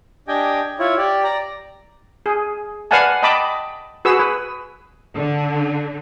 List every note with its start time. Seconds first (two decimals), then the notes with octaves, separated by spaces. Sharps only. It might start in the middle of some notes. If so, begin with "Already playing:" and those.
0.28 D4 G4 D#5 G5 G#5
0.79 E4 F4 C#5
0.98 G4 D5
1.24 D5 A#5
2.26 G#4
2.91 B4 D5 F5 F#5 G#5 A5
3.23 D#5 G5 A5 B5 D6
4.05 F#4 G#4 B4 E6
4.20 B4
5.16 D3